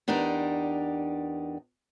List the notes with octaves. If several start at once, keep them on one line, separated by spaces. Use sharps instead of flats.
E2 D4 D#4 G4 A#4